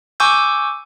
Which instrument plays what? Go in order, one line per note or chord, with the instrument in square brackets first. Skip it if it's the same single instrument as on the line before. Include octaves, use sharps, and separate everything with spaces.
[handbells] G#5 C#6 D6 E6 G6